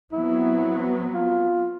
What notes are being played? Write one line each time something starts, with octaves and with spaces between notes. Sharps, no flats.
F#3 B3 C4 E4
F4